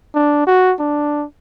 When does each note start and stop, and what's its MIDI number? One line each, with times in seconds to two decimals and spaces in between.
0.15 0.42 62
0.47 0.74 66
0.79 1.25 62